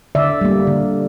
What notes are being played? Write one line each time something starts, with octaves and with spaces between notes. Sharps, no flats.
D3 D5 E5
G3 A#3
D3